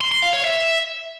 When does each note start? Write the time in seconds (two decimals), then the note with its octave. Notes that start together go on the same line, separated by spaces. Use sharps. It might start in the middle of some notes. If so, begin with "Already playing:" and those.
0.01 C6
0.12 C6
0.23 F5
0.33 C#5
0.44 E5